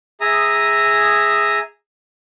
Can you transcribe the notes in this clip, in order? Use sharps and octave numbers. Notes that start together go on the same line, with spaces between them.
G#4 E5 A#5 D#6